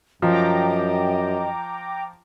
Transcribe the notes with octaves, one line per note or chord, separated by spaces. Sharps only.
F#2 F3 D#5 G5 A#5 D6